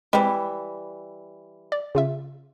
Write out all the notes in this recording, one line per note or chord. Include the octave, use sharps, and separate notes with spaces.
E3 G3 G#3 C4
D5
C#3 F4 E5